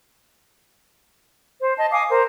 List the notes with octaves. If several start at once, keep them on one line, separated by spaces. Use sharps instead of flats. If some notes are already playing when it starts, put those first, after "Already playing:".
C5
D#5 A5
F5 G#5 D6 D#6
A#4 C5